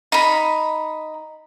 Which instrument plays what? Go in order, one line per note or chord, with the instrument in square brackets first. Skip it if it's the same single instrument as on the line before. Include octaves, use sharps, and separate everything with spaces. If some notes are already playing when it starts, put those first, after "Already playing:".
[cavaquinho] D#4 B5